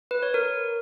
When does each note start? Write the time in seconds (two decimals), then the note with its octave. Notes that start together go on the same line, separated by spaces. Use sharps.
0.11 B4
0.23 C#5
0.34 A#4